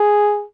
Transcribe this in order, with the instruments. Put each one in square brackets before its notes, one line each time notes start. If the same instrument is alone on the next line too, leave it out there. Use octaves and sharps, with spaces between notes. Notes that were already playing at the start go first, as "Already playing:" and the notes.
Already playing: [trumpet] G#4